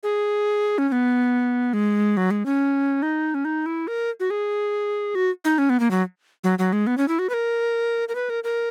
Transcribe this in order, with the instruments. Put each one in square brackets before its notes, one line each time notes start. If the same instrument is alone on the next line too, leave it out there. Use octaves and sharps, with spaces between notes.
[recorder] G#4
C#4
C#4
B3
G#3
F#3
G#3
C#4
D#4
C#4
D#4
E4
A#4
F#4
G#4
F#4
D#4
C#4
B3
A#3
F#3
F#3
F#3
G#3
B3
C#4
E4
F#4
B4
A#4
A#4
B4
A#4
A#4